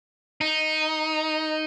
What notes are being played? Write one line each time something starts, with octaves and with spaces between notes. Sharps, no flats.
D#4